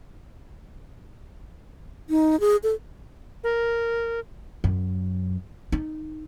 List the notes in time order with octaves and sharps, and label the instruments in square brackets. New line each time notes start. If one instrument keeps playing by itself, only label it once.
[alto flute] D#4
G#4
A4
[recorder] A#4
[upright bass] F#2
D#4